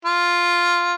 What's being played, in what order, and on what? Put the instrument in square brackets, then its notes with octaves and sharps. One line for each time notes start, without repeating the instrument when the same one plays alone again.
[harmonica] F4